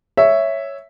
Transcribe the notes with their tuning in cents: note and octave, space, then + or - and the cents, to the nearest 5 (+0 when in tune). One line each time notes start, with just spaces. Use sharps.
C#5 +0 E5 +0